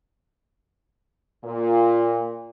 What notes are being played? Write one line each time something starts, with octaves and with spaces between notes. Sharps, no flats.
A#2